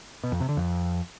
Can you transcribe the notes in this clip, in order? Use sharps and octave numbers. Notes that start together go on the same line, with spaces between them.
B2
F2
C3
D3
F2